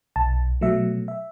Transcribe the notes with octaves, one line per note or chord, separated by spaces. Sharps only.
B1 A5
B2 F#3 A3 E5
E5